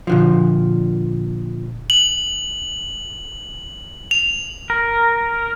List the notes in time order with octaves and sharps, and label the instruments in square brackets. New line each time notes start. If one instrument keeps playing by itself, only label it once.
[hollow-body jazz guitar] A#2 D3 F3
[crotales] F#7
F7
[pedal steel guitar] A#4